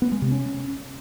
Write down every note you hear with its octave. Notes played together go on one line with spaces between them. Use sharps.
B3
G#3
C3
C#4